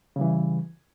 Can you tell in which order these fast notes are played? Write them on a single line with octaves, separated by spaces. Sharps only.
C#3 G3 E3